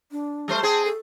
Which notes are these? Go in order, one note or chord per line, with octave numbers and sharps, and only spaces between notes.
D4
G3 A3 C5
C4 G#4 A5
A4